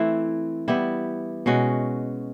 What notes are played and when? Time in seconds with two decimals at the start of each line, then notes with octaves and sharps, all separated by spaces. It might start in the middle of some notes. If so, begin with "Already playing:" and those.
Already playing: E3 A3 C4 E4
0.68 G3 B3 E4 G4
1.46 B2 G#3 C#4 F#4